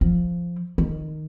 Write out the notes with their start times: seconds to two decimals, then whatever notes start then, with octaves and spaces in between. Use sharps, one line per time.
0.01 F3
0.78 D#3